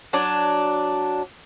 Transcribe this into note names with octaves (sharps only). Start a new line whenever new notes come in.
F#3 D4